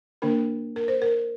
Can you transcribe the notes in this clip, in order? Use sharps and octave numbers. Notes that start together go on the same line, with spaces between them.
D3 A#3 D4 A#4
A#4
C5
A#4